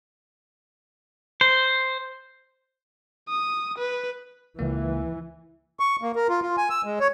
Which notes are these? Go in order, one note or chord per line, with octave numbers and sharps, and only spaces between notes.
C5
D#6
B4
C#2 E3 A#3
C#6
A#3
A#4
F4
F4
G#5
E6
G#3
C#5